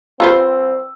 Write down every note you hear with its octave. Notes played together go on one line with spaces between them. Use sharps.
C4 F4 B4 C5 E6